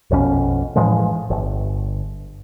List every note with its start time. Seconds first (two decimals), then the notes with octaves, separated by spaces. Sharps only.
0.10 A#1 F2 B2 C#4
0.76 A2 E3 F3 G#3
1.30 G1